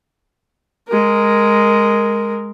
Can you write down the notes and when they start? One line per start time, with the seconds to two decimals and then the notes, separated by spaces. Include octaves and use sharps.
0.88 G#3 A#4